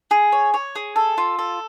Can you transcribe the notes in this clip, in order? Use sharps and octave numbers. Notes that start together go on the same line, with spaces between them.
G#4
C#5
C#5
G#4
A4
F4
A4